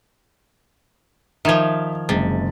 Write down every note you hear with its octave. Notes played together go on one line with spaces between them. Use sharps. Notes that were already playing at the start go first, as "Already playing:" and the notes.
D#3 F3 E5 G#6
F#1 C3 G#3 A6